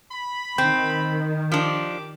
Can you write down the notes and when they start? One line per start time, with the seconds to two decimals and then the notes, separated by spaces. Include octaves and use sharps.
0.12 B5
0.58 D#3 C4 G6
1.52 F3 D4 G4 D6